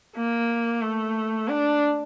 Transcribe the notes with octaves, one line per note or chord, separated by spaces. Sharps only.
A#3
A3
D4